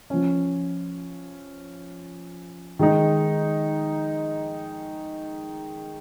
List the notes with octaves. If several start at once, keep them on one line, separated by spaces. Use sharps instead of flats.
F3 C#4
D#3 G#3 D#4